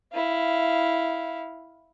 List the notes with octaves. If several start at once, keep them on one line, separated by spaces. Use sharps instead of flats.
E4 F5